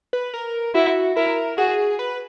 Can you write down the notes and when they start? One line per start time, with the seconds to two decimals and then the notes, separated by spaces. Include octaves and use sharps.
0.13 B4
0.34 A#4
0.75 E4 F#4
1.16 E4 A#4
1.58 F#4 G#4
1.99 B4